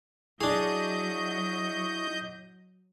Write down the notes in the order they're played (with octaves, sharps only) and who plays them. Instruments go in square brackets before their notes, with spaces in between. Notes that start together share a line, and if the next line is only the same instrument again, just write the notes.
[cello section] F#3 [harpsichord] D4 G#4 [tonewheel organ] E4 C#6 [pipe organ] D#5 G6